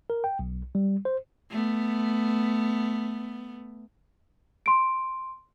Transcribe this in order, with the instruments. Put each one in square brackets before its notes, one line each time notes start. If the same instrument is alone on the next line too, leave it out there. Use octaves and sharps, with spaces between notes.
[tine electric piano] A#4
G5
B1
G3
C5
[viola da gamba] A3 B3
[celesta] C6 D7